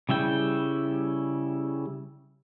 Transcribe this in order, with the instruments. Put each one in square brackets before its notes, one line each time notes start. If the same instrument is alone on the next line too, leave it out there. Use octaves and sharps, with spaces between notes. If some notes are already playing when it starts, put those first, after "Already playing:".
[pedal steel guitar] C#3 G3 E4 G5